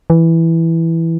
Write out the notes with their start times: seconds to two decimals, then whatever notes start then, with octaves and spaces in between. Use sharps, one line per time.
0.10 E3